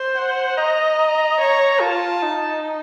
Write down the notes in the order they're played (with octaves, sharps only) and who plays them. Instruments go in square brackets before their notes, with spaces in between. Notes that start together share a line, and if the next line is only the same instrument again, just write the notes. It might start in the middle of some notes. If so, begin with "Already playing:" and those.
Already playing: [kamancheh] C5
[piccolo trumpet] F#5
[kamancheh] D#5 [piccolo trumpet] A#5
[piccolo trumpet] A#5
[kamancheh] C#5 [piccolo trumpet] A#5
[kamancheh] F4 [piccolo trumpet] A5
[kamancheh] D#4